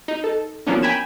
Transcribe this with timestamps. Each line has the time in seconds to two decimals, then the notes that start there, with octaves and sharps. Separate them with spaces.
0.08 D#4
0.24 A4
0.67 F3 F#3 A#3 B3 C#4 D4
0.83 G5 G#5 A#5 B5 G#6 E7